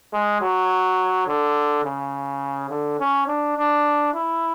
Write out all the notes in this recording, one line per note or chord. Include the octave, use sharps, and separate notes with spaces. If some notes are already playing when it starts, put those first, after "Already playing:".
G#3
F#3
D3
C#3
D3
C#4
D4
D4
E4